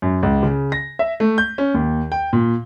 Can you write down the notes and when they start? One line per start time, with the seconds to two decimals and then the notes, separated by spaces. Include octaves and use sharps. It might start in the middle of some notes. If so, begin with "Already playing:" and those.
0.02 F#2
0.23 C#2
0.43 C#3
0.72 A#6
0.99 E5
1.20 A3
1.38 G6
1.58 C#4
1.74 D#2
2.12 G5
2.33 A#2